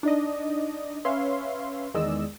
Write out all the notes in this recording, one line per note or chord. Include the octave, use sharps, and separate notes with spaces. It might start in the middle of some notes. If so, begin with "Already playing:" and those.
D4 D#4 D5 D#5
C#4 B4 C#5 E5 F5 C6
E2 D#3 G#3 D5 D#5 E6